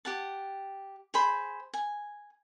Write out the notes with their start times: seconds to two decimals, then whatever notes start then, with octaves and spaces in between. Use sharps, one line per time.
0.05 G4 F#5 A5
1.14 G#4 C5 B5
1.74 G#5